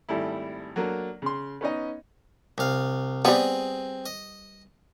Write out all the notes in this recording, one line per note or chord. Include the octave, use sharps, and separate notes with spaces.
G#1 G3 A3 E4
F#3 A#3 D4 A4
C#3 C6
B3 C#4 D#4 D#5
C2 F5
G3 B3 C4 G#4 D#5
D#5